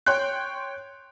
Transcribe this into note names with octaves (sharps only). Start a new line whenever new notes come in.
C#5 G5 C6 F#6